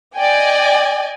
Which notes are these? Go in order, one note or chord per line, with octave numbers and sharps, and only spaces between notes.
D5 D#5 G5 G#5